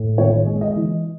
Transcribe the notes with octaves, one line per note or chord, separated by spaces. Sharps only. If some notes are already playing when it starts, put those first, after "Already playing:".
Already playing: A2
G#1 C#5
G#3
D#5
E3